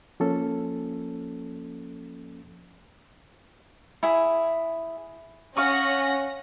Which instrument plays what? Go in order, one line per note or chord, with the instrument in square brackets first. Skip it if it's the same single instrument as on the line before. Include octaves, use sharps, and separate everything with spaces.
[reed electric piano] F3 A#3 C#4 A4
[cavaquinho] E4 G#4
[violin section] C#4 F#5 A#6 [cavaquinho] F5 C#6 D#6